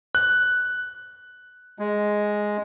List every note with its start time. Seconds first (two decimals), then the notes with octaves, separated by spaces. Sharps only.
0.15 F#6
1.79 G#3